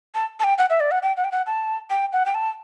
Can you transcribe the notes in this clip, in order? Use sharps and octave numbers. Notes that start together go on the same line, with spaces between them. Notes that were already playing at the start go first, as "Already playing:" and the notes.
A5
A5
G5
F#5
E5
D5
F#5
G5
F#5
G5
F#5
A5
G5
F#5
G5
A5